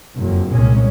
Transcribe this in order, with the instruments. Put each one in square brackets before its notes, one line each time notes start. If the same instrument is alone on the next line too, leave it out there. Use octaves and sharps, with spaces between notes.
[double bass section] F#1 F2
C2 A#2 G#3 C#4